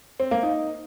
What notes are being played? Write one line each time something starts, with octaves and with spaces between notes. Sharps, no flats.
C4
A#3
D#4